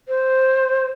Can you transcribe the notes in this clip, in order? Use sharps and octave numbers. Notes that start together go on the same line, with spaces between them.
C5